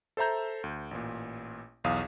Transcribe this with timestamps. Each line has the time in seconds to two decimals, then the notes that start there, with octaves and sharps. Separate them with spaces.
0.17 A4 C5 E5 A#5 G6
0.64 D2
0.91 A1 A#2
1.84 B1 E2 F5 D#6